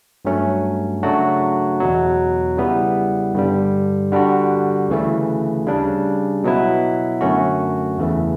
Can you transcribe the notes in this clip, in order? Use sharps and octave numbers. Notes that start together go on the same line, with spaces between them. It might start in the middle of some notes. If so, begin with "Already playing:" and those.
G2 F#3 A3 C#4
C#3 F#3 A3 D4 F#4
E2 B2 F#3
C#3 G3 B3 E4
G2 D3 G3
D3 G3 D4 F#4
D2 C#3 E3 A3
C#3 G3 D4
B2 F#3 B3 E4
F#2 D3 A3 C#4 F#4
E2 C#3 E3 A3